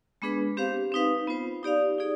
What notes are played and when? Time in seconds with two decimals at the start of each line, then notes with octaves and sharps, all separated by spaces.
0.22 G#3 B3 D4 G#4 B4
0.57 C4 G4 C5 F5
0.92 C4 D#4 B4 F5
1.27 B3 F4 C5
1.63 D#4 G4 D5 F5
1.98 D#4 G#4 D5